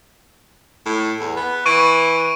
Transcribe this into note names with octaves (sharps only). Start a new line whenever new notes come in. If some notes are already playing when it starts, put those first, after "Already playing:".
A2
E2
B3
E3 C#6 D7 D#7